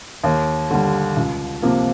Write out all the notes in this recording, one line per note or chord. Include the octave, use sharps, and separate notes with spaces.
D#2
D3 G3
C#2
C3 F3 A#3